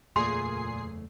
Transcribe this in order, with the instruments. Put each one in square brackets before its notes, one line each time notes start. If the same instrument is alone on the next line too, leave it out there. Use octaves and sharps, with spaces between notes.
[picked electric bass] F#1 E2 A3 [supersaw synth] A#2 G#4 C7 [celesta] C6